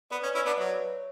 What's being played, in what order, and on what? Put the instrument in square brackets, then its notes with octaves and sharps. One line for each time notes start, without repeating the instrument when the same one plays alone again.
[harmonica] B3 [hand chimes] B4 D5
[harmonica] C#4
[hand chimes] B4 D5
[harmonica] C#4 E4
[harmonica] B3 D4 [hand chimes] B4 D5
[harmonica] F#3 [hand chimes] C#5 E5